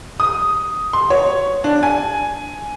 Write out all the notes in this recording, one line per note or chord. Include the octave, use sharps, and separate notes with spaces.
D#6
C6
C#5
D4
G#5